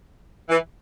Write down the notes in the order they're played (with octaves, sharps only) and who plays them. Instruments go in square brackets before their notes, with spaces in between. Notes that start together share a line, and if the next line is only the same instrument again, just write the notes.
[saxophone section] E3